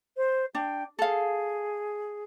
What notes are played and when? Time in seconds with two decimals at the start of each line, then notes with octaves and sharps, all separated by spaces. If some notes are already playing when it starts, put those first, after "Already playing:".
0.17 C5
0.55 D4 G5
0.99 G#4 A4 F5